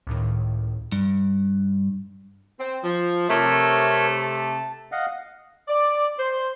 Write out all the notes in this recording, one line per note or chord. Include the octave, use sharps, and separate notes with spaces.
C#2 A2 D#3
G2
C4
F3
C3 A3 A4 A#4 C#5
A5
D#5 F5 F#5
D5
C5